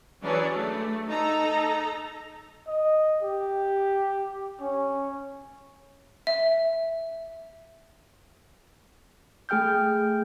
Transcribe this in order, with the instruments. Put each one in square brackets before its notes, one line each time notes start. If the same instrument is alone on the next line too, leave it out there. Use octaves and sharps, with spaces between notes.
[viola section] E3 F#3 C#4 D4 G#4 D5
A3
D#4 A4 A#5
[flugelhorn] D#5
G4
C#4
[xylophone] E5
[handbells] A3 G#4 G5 F6 G6